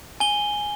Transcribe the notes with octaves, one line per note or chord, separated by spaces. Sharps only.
G#5 G7